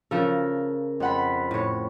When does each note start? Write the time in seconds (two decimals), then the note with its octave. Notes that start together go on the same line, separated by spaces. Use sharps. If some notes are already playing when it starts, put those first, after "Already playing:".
0.11 C#3 F3 A4 A#4
1.00 F2 F#5 B5
1.51 A2 C#5